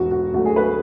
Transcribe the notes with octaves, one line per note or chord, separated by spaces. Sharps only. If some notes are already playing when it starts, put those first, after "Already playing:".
Already playing: E1 F#4
F#4
D2 D3 F#3 A3 F#4
G#4
B4